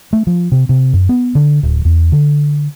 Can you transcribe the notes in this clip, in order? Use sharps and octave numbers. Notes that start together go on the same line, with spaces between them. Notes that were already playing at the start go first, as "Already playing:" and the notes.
A3
F3
C3
C3
F#2
B3
D3
D1
E2
D3